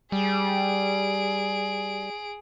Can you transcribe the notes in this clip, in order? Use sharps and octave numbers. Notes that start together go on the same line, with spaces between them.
G3 G#4 D7